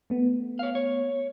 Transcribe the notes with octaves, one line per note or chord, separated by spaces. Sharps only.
A3 B3
C#5 F5
C#5